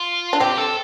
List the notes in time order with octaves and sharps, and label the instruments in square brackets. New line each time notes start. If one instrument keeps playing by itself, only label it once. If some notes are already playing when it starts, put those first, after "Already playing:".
Already playing: [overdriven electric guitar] F4
[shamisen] D4
[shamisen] C4 [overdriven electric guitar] G4
[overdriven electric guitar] A4